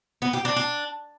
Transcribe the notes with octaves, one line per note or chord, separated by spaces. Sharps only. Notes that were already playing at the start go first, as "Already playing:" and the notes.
B3
G4
D4
D4